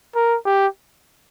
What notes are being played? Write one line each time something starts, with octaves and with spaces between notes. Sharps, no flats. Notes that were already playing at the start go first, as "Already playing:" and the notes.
A#4
G4